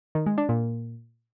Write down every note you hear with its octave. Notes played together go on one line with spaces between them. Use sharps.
D#3
G#3
D4
A#2